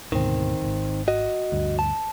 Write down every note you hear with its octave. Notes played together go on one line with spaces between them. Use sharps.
D2 G#2 B2 D#3 C4
D#1 G#1
F#4 D#5
D2 G2
A5